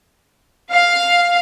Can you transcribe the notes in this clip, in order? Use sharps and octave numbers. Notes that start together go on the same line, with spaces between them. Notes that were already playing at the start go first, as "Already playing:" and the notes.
F5